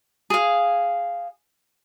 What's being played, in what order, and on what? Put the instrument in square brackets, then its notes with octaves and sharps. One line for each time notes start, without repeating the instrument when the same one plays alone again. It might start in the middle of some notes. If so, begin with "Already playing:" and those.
[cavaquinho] G#4 F5